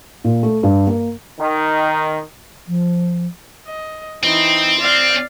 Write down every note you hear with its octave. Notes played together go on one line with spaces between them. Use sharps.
A#2
A3
G2
A#3
D#3
F3
D#5
E3 C4 D#4
D5 F5